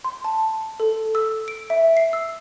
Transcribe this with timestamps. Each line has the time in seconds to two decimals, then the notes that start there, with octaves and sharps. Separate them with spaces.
0.04 C6
0.25 A5
0.80 A4
1.15 E6
1.48 D7
1.70 E5
1.97 C7
2.13 E6